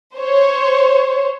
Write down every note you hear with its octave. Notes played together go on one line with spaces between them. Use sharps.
C5 C#5